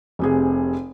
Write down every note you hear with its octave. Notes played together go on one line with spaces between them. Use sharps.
F1 C3 G#4